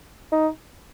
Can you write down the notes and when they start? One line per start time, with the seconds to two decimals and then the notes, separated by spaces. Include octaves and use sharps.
0.32 D#4